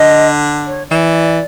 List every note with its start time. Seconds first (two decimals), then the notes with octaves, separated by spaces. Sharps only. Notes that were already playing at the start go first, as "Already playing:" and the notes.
Already playing: D3 D#5
0.67 C#5
0.90 E3 D5